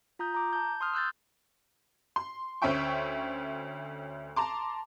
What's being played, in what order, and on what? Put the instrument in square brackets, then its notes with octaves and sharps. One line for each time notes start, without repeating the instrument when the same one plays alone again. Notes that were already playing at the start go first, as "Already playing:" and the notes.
[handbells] F4 A#5 D#6 G6
A#5 D6
A5 G6
C6 D#6 F6
E6 F#6 G6 A6
[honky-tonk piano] C6
D2 C#4 C5 E5 G5 C#6
A5 A#5 C6 D6